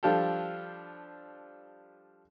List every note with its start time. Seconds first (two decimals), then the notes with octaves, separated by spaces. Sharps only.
0.03 F3 G3 D4 F4 G4 A4